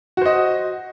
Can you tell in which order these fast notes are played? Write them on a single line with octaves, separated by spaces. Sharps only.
F#4 C5 D#5